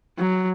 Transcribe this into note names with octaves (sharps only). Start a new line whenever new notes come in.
F#3